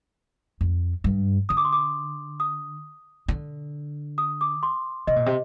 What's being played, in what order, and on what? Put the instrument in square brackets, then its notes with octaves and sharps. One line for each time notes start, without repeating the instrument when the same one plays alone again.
[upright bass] F2
G2
[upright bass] D3 [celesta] D#6
[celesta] D6
C6
D6
D#6
[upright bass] D3
[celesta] D#6
D6
C6
[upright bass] C3 [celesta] D#5
[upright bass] A#2
C3